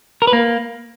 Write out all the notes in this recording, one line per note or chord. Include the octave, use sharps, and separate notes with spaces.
A#4
B4
A#3